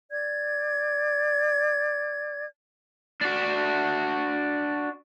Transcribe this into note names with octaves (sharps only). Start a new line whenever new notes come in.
D5 G#6
D4 F#4